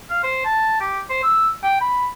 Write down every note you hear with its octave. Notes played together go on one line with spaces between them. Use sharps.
F5
C5
A5
G4
C5
E6
G5
B5